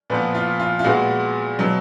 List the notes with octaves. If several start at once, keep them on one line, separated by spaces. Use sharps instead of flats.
A#2 F3 B3 B4
F4
F4
F4
A#2 G#3 B3 F#4
B2 F#3 B3